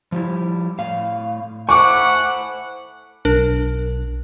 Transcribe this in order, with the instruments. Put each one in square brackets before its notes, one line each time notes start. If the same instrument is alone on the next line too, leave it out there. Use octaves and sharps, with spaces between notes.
[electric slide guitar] F3 G3 E4
A2 F5
[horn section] A3 E4 F#5 [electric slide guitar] C5 G#5 [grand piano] C#6 D6
[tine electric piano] B1 [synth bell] D4 A#4